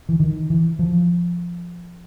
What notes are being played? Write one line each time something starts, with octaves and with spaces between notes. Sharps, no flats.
E3
D#3
E3
F3